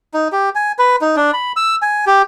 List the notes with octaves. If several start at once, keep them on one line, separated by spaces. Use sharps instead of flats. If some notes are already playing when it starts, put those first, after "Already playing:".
D#4
G4
G#5
B4
D#4
D4
B5
E6
G#5
G4